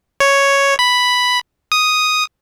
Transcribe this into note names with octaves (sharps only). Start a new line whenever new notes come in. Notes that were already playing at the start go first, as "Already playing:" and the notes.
C#5
B5
D#6